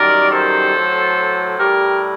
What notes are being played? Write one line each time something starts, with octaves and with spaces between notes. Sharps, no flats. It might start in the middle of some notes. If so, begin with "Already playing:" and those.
Already playing: F#2 D#3 G3 A#4 D5
A4 C5
A2 F#3
A2 G3 G4 A#4